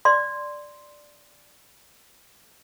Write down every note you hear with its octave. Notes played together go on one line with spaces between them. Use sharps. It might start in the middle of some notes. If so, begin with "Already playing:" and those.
D5 C6